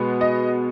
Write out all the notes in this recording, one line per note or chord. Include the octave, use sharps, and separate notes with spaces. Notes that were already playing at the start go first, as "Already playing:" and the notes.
Already playing: B2 G#3 B3
D#5